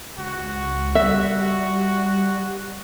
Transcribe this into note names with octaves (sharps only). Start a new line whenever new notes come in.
C#2 F#4
G3 E5